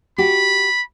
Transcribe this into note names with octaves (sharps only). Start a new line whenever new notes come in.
F#4 G4 B5